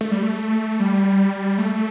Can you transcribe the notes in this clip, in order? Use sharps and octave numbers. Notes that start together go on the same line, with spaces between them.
A3
G3
A3
G3
A3